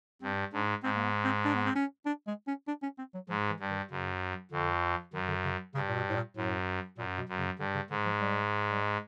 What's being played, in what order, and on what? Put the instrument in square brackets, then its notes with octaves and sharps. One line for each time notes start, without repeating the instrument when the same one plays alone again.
[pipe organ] G2 [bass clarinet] C4
[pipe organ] G#2 [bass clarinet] D4
[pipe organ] G#2 [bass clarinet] C4
[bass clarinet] A#3
B3
C4
D4
B3
C4
C#4
D4
G#3
C#4
D4
C#4
C4
F#3
[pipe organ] G#2 [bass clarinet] F3
[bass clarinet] E3
[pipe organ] G2
[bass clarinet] D#3
[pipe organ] F#2 [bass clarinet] C#3
[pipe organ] F2 [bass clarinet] D3
[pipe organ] F#2 [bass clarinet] D#3
[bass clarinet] D3
C#3
[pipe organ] G2 [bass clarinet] C#3
[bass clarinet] A#2
B2
A2
A#2
[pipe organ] F#2 [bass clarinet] A2
[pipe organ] F#2 [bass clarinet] A#2
[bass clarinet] B2
[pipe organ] F#2
[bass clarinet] C#3
[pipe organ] G2 [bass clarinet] D3
[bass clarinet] C#3
[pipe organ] G#2 [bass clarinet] D3
[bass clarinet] F3
G3
G3
G#3